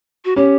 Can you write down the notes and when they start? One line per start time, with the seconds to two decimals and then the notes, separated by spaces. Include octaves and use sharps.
0.25 F#4
0.36 C#4 G4